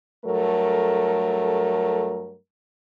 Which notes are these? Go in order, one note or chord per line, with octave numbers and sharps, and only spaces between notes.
G2 F#3 A3 A4 A#4